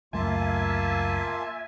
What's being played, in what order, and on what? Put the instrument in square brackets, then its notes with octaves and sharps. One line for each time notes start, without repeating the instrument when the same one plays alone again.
[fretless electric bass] C#2 F#2 A3 [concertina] A#3 F4 A5 [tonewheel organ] E5 G#5